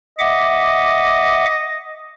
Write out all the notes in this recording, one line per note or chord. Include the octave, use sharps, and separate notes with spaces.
D#5 E5 F#5 D6